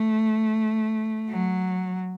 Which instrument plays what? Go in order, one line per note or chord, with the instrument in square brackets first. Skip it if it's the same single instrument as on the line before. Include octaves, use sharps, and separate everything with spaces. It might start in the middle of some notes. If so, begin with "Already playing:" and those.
Already playing: [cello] A3
F#3